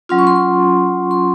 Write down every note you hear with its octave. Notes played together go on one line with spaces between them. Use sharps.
F#3 C#4 F4 C6
C#6
C6
C#6
C6